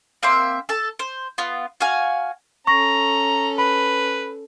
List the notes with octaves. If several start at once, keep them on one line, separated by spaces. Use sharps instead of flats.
A#3 C4 E5 C6
A4 A5
C5
B3 F4
F#4 F5 G#5
C#4 A4 A#5 C#6 A#6
B4 B5